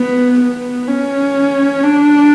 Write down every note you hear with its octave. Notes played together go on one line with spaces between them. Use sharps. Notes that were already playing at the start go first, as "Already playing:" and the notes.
Already playing: B3
B3
C#4
D4